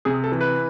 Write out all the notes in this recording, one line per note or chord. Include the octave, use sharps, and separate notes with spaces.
C3 G#4
A4
E3
B4